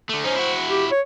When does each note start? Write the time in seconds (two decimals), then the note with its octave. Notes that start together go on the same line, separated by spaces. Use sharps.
0.09 D3 A3
0.24 C#4 D#4 C5
0.35 E4 F#4
0.67 G4
0.91 C#5